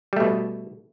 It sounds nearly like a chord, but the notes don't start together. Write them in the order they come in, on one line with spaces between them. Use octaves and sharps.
G3 A3 B2